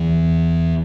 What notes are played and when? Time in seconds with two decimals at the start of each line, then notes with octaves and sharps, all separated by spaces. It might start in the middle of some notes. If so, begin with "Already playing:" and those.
Already playing: E2 E3